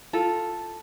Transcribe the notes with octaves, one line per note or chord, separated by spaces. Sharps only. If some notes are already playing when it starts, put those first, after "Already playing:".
F4 A4